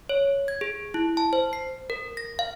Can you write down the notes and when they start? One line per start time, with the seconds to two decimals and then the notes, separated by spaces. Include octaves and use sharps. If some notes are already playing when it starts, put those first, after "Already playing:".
0.09 C#5
0.48 G#6
0.61 G#4
0.94 E4
1.17 A5
1.33 C5
1.53 C7
1.90 A#4
2.17 A#6
2.39 F5